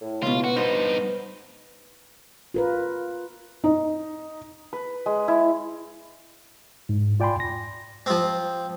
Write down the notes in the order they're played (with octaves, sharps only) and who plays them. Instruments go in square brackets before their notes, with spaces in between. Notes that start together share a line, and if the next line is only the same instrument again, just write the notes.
[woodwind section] A2
[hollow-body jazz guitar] C#2 B2 [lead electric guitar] F4
[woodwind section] B3 [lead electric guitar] F#4
[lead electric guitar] G2 D#4 [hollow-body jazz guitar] C5
[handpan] F4 A#4 B4
[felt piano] D#4
[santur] B4
G#3
E4
[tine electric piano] G#2
F4 D5 G5 G#5 B5 C6
A#6
[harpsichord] F3 C4